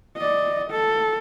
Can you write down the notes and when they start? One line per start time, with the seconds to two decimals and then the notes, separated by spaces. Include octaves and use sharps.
0.17 D5 D#5
0.70 A4